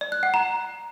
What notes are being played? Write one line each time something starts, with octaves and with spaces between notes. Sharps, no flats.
D5
F#6
F#5
A#5